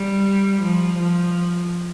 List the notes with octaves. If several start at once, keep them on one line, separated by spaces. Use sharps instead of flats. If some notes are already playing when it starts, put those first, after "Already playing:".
Already playing: G3
F3
F3